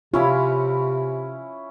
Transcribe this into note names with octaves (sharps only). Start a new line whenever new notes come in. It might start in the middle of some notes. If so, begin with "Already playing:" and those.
C3 C#4 E4 F4 B5